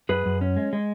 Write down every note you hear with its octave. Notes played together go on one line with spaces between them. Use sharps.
F#2 G#4 B4
F#2
C#4
G#3
G#3